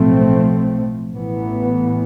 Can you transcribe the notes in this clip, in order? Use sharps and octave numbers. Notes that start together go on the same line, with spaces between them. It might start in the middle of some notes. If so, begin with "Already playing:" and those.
Already playing: B1 A2 F3 A3 C4
A1 A2 E3 B3